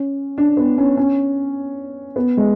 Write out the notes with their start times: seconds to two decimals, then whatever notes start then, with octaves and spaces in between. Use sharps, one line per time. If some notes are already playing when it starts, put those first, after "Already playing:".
Already playing: C#4
0.38 D4
0.57 B3
0.78 C#4
0.97 C#4
2.16 B3
2.37 G#3